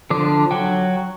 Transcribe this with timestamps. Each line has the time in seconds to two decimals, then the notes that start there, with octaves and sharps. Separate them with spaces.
0.10 D3 F3 D4 D6
0.51 F#3 F#4 G5